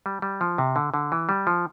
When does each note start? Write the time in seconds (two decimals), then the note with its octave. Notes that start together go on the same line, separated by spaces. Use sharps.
0.06 G3
0.22 G3
0.41 F3
0.58 C3
0.76 D3
0.94 D3
1.12 E3
1.29 G3
1.47 F3